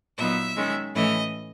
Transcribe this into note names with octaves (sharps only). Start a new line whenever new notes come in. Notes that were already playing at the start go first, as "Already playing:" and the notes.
A#2 F#3 B3 D#4 E5
D#3 G#3 C#4
A2 E3 A3 C#4 D#5